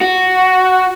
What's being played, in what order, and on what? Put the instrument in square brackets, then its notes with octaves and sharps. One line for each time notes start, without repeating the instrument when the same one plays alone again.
[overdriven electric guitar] F#4